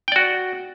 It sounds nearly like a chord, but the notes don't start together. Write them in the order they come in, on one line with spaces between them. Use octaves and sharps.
G5 D5 F#4